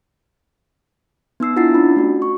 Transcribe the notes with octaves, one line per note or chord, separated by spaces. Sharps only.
B3 D#4 E6 C7
D4 E4 F4 F#5 A6 C7
C#4 D4 B5
A3 F#4
C#6